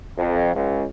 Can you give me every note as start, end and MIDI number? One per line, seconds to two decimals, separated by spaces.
0.17 0.53 41
0.55 0.84 37